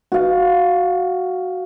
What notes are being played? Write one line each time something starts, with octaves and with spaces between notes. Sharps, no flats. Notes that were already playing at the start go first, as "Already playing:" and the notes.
F#4 F5